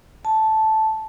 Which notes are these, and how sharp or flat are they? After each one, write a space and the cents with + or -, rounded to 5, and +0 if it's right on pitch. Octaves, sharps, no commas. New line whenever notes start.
A5 -5